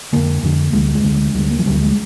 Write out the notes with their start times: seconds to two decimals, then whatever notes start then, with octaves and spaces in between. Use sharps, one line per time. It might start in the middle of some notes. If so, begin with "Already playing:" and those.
0.13 F2 D3 A#3
0.43 F2 D3
0.73 D2 D3 G#3
0.85 G3
0.95 G#3
1.04 D2 D3
1.35 D2 D3 G3
1.50 A#3
1.59 F3
1.66 D2 D3 G3
1.81 G#3